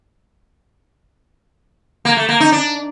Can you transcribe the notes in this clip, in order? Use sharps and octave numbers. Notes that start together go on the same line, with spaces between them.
A#3
A3
A#3
D#4
D4